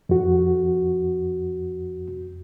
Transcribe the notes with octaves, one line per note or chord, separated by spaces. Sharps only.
F2 F#4